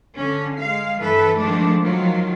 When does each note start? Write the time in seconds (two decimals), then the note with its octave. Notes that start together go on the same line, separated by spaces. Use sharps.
0.16 D3 C#4
0.59 G#3 F5
0.98 G2 E3 A4 B4 E5
1.37 D#3 F3 G#3 A3 D4
1.81 D#3 F3 F#3 F4